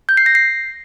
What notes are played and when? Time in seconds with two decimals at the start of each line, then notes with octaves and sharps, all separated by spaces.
0.09 G6
0.17 C7
0.26 A#6
0.35 C7